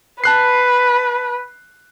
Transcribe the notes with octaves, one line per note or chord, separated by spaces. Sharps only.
B4 A5 F#6 C7